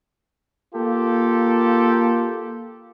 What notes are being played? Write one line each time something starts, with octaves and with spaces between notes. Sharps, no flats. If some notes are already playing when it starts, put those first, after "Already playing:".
A#3 F4 G4 A4